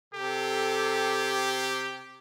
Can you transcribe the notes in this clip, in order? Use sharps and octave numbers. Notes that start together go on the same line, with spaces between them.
C3 G4 A4